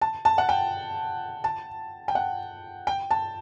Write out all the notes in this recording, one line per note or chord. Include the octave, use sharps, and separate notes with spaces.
A5
A5
F#5
G5
A5
G5
F#5
G5
A5